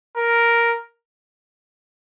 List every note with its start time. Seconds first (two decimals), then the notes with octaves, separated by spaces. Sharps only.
0.16 A#4